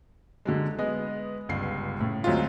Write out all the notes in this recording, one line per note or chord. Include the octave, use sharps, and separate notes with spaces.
D3 F#3 G#3
G#3 B3 D#5
G1 C#2 C7
A2 C#3
D2 F#3 G#3 C4 F4